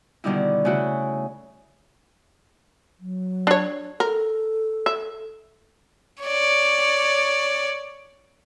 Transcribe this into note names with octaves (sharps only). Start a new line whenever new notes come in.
B2 D3 D#3 G3 D#4 E4
C#3 A3 E4 F#4
F#3
D4 C#5
A4 A#4
E5
C#5 D5